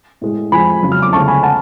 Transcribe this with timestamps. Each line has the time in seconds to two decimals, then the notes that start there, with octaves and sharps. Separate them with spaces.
0.21 A2 G#3
0.52 F2 F3 G#3 G#5 B5
0.83 F2 C#3 F#3
0.92 F6
1.02 D6
1.13 D2 C#3 G#3 A5 C#6
1.28 G#5 B5
1.43 F#5 A5